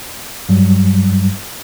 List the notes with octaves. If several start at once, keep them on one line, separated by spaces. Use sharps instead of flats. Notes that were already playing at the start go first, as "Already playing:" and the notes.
G2 F#3 G3